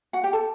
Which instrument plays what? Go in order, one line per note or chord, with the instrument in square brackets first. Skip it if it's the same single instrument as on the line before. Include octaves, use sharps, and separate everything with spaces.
[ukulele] F#4 F#5
G4 G5
A4 A5